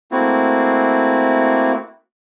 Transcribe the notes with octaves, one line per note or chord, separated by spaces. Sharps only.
A3 A#3 C4 E4 F#4